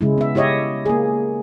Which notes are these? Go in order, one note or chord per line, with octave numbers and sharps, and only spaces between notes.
C#3 G#3 E4
B3 E5
E4 G4 C#5 D#5 E5
A#3 G#4